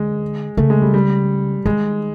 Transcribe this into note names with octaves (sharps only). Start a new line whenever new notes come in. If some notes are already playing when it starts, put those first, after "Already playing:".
Already playing: D3 G#3
C#3 A3
G#3
G3
G3
D#3 G#3